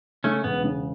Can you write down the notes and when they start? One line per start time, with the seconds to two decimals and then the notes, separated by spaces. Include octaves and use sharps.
0.24 C#3 A3 C#4
0.44 E1 B3
0.64 C#3